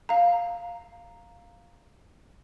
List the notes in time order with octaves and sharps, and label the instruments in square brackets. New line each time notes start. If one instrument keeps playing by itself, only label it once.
[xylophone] F5 A#5